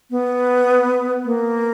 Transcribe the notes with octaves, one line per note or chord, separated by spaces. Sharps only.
B3
A#3